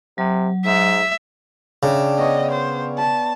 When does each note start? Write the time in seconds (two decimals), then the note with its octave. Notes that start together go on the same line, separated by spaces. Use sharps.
0.18 C3 F#3
0.65 G#2 E5
1.83 C#3 D4 E5 G5
2.18 B3 C#5 D#5
2.52 C5
2.98 A5 B5